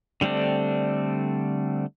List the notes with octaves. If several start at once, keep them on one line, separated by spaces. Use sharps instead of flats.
D3 G3 A3 C4 D4